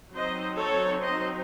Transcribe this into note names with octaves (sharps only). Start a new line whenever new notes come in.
F#3 C4 D#4 C5 D#5
A4 C#5
C5 D#5